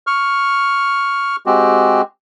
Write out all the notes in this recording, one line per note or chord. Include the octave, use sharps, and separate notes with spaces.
C#6 F6
G#3 C4 F#4 G4